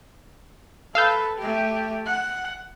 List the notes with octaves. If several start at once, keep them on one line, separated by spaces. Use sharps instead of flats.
A4 B4 F5 E6 G6
A3 G4
F#5